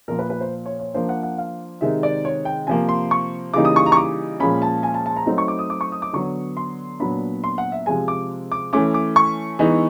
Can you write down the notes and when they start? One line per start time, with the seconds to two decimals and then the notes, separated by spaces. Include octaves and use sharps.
0.08 A#2 F3 A#3 A#4
0.19 B4
0.30 B4
0.40 C5
0.66 C#5
0.80 C#5
0.94 F3 A#3 D4 C5
1.09 F#5
1.23 F#5
1.38 F5
1.81 C3 D#3 G#3 C4 D#4 E5
2.03 D5
2.25 C#5
2.45 G5
2.67 C3 F3 A#3 G#5
2.89 C6
3.11 C#6
3.54 C#3 E3 G3 A#3 D#4 D6
3.65 D#6
3.76 C#6
3.86 A#5
3.92 C#6
3.97 D6
4.40 A#2 F3 G#3 C#4 B5
4.62 A5
4.83 G#5
4.94 A5
5.06 A5
5.17 A#5
5.26 F#3 A3 C4 D#4
5.38 C#6
5.48 D6
5.59 D#6
5.70 D6
5.81 C#6
5.92 D#6
6.02 D6
6.13 D3 F#3 B3 C#6
6.57 C6
7.00 A#2 F#3 B3 D4 B5
7.44 C6
7.58 F#5
7.72 E5
7.86 C3 F3 G#3 G#5
8.08 D6
8.52 D6
8.73 E3 A3 C#4 D6
8.94 D6
9.16 C#6
9.59 E3 G#3 B3 D#4